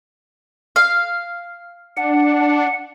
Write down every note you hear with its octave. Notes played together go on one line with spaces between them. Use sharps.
F5
D4 F#5